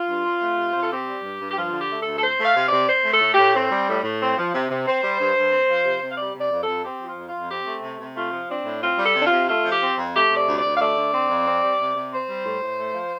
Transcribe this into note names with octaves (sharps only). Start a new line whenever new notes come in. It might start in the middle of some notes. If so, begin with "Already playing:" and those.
Already playing: F4
G2
C4
A3
C3
C3 C5
A4
C4 G4
G3
G2
G2
G4
F3 F4
D3
G4
A3
A4
D2
A4
C4 C5
A3 F5
C3
D5
C3
C4 C5
A3
A4
A2
G4
A2
C4
G3
A2
A2
C4
F3
C3
C3
C4 C5
G3
G2
G2
C4
F3
C3
C3
F5
G3 D5
C3
D5
F2
A4
F2
C4 G4
F3
F4
F2
F4
F2
C4 G4
A3
C3
C3
A3 F4
F3
C4 D4
A2
C4 F4
G3
A4
C3
D4
F4
C3
A3 F4
F3
G4
C4
F2
A3 G4
C3
D5
D2
D5
D2
F5
A3 D5
D3
C4
F2
C4
G3
C3
C3
C4 C5
G3
A2
A2
A3
F3